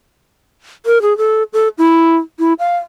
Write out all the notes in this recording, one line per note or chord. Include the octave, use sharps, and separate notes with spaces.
A#4
G#4
A4
A4
E4
E4
F5